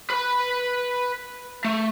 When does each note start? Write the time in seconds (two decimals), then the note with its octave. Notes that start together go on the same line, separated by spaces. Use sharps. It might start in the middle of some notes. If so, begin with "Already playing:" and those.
0.10 B4 B5
1.65 A3